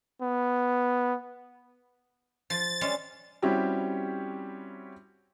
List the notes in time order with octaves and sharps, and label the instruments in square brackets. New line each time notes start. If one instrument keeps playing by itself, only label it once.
[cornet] B3
[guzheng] F3 [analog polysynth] A6
[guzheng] G3 G#3 C#4
[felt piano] G3 C4 C#4 E4 F#4 G4